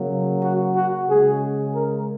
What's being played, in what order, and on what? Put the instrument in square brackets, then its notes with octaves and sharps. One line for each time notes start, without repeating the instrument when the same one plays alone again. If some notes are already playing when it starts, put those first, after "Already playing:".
Already playing: [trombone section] C#3 F#3 A#3
F#4
F#4
C#3 G#3 G#4
A#4